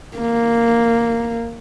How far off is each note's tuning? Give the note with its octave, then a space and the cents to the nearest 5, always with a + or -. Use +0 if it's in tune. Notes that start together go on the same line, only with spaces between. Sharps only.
A#3 -5